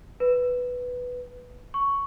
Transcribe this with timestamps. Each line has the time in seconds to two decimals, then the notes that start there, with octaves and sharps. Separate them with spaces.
0.20 B4
1.74 C#6